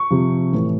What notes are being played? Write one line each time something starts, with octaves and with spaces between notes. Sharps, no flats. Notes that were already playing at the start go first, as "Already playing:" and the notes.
Already playing: C#6
C3 F3
A2 E3